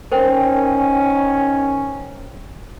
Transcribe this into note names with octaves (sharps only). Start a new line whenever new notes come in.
D#3 C#4 A#4 C5 G5